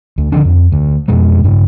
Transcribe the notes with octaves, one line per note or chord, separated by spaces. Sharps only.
D2
D3 D#3 F3 D4
F2
D2
F2 B2 G#3
G2 C#3